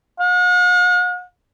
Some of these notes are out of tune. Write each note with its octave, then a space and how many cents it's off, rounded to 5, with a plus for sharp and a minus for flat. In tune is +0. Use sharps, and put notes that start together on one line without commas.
F#5 -45